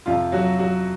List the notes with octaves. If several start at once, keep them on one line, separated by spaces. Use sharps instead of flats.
F2 C3 F3 F4
F#3 F#4
F#3 F#4